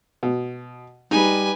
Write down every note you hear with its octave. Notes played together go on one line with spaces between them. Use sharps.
B2
G3 D#4 B4 G#5